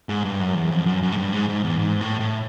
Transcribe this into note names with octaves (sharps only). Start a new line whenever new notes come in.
G#2
G2
F#2
E2
F2
F#2
F#2
G#2
G2
G#2
G#2
E2
G#2
A2
A2